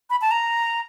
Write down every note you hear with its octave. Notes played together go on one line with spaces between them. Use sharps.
B5
A5
A#5